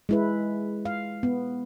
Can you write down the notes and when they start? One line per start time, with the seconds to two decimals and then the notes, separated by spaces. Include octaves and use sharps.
0.09 G#3 E4 B4
0.85 F5
1.23 B3